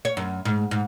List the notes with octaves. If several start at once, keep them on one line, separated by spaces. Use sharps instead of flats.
C#5
F#2
G#2
G#2